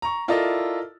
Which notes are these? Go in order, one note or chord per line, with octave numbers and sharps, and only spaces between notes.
A#5 C#6
E4 F4 A4 A#4 D5 D#5